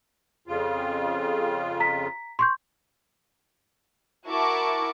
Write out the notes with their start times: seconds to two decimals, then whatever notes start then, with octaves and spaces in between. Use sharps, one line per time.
0.48 F2 C#3 F4
1.80 A#5 B6
2.39 C6 C#6 G6
4.28 E4 F#4 A#4 A5 C#6 D6